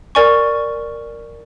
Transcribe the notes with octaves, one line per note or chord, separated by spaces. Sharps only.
A#4 D5 G#5 C#6